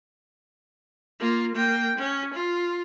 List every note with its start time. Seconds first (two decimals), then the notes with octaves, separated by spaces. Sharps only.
1.20 A#3 F4
1.55 A#3 G5
1.98 C#4
2.33 F4